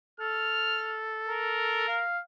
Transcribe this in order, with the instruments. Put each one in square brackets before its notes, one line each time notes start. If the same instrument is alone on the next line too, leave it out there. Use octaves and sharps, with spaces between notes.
[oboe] A4 [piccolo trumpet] F6
[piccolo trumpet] A#4
[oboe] F5